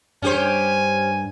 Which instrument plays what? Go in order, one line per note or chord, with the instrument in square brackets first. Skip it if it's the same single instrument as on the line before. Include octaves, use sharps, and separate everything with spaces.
[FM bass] G2 [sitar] C#4 G4 C5 [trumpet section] G#5